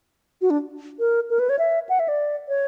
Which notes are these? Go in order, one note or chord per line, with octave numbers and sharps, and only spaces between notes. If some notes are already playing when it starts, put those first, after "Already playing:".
F#4
D4
A#4
A#4
B4
C#5
E5
F#5
E5
D5
C#5